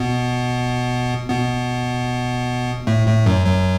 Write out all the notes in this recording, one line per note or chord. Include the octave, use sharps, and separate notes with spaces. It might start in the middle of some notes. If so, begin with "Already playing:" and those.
Already playing: B2 B3
B2 B3
A2 A3
A2 A3
F#2 F#3
F#2 F#3